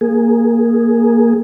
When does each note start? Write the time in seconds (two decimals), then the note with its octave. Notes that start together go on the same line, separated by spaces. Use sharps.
0.01 A#3 G#4